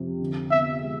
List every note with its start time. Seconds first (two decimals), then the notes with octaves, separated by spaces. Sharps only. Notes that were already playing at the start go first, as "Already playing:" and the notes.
Already playing: F2 C3
0.21 D3
0.51 B3 E5
0.81 G#3